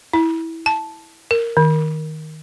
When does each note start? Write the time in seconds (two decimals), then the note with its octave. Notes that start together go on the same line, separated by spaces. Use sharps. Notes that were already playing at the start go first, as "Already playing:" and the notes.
0.13 E4
0.66 A5
1.31 A#4
1.57 D#3